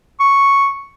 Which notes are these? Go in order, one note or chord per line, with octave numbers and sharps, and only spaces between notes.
C#6